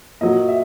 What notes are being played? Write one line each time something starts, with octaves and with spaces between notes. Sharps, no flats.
A#2 F#3 D#5
E5